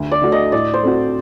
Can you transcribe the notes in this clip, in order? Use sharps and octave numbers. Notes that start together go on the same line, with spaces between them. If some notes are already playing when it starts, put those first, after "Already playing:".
Already playing: D2
D5
D3 A3 D4 F#4
D#5
A2 D5
C5
A3 C4 F#4